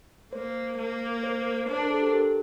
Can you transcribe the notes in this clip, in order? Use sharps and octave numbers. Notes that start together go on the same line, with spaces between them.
A#3 C5
A#3
C5
D4 C5
A#4
A4
G4
A#4